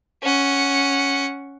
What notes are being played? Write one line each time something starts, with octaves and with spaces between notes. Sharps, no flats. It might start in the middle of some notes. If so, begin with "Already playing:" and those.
C#4 F#5